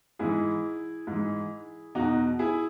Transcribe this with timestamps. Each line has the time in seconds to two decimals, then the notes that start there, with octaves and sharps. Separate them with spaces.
0.19 G#2 E3 E4 G#4
1.07 G#2 E3
1.95 E2 B2 D#4 F#4
2.39 E4 G#4